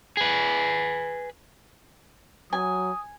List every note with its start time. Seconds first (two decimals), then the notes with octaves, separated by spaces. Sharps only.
0.17 G#4 B4
2.53 F#3 G#5 D#6